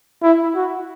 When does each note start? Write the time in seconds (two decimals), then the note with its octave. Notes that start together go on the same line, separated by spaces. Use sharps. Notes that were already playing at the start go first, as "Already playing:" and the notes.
0.23 E4
0.55 F#4